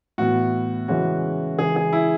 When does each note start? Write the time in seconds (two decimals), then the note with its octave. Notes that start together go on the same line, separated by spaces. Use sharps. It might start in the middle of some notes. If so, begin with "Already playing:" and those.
0.18 A2 E3 B3 F#4
0.88 C#3 E3 G#3 C#4 F#4
1.58 C#3 E3 G#3 G#4
1.76 G#4
1.93 E4